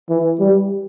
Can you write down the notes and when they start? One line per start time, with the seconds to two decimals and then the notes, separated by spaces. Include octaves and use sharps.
0.09 E3
0.40 G3